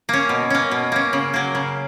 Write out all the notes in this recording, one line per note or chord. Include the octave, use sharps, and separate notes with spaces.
A#3 C#4
B2
A#3 C#4
B2
A#3 C#4
C#3
F#3 A#3
C#3